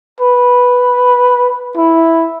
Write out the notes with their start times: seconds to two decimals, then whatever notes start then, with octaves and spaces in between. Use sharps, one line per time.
0.20 B4
1.76 E4